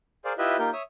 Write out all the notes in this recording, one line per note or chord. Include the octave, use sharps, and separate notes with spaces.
G#4 A#4 C5 D5 F5
E4 F4 G4 B4 D#5 E5
A#3 D#4 F4 G4 A#4 G6
C#5 E5 D#6